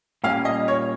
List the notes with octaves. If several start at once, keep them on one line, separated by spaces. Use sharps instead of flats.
A#2 G3 A#3 C#4 F5
D#5
C#5